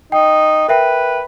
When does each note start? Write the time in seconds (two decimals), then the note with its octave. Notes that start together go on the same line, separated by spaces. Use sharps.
0.12 D#4 G5
0.69 A#4 B4 E5 G5